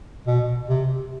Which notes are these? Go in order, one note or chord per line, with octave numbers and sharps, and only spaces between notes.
B2
C3